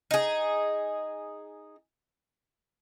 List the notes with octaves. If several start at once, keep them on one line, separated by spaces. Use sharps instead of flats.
D#4 G#4